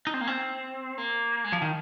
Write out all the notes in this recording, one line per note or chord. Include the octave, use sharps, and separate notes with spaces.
D#4
C4
A#3
C4
A#3
G#3
F3
D#3